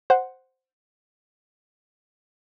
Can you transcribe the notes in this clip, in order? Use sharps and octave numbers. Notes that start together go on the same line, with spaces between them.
C5 F#5